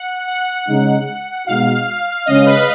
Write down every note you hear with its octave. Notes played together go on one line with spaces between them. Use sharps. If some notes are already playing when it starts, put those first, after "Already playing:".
Already playing: F#5
F#5
C#3 G#3 D#4
B2 G#3 D#4 F#4 F5
C#3 G#3 C#4 D#5
B4